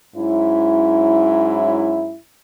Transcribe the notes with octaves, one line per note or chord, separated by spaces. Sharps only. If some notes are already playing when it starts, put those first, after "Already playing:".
G#2 F#3 C#4 E4